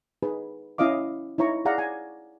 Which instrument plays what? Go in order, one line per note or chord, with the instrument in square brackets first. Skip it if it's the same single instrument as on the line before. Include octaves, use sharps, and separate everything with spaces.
[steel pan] D#4 G#4 B4
C#4 E4 D#5 F5 D6
D#4 E4 C#5 A#5 C#6
G#4 D5 F5 F#5 A#5
G#5